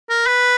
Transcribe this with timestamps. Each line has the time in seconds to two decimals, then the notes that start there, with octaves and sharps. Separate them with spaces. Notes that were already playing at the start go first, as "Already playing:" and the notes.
0.10 A#4
0.27 B4